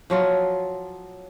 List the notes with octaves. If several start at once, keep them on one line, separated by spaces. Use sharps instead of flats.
F3 F#3 F4